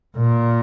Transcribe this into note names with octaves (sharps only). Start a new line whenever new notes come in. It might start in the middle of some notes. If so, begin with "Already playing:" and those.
A#2